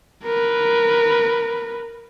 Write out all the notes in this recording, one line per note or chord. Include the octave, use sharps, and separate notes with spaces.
A#4 B4